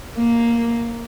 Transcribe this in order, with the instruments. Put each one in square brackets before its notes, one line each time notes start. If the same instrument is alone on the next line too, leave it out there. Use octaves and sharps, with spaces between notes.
[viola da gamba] A#3